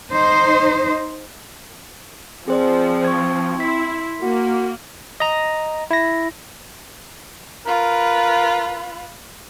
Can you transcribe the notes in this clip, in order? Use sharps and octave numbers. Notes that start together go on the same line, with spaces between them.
D#4 C5
F3 C4 G#4 C5 D5
C#6 G#6
E4 C6 B6
A#3 F#4
D#5 A#5
E4 A#6
F4 A#4 B4